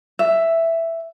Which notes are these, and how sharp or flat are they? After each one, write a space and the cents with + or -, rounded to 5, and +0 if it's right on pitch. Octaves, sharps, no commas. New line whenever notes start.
E5 +5